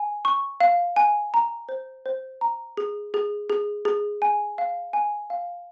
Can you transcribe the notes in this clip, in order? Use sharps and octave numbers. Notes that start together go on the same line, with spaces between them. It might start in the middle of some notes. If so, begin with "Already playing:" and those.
Already playing: G#5
C#6
F5
G#5
A#5
C5
C5
A#5
G#4
G#4
G#4
G#4
G#5
F5
G#5
F5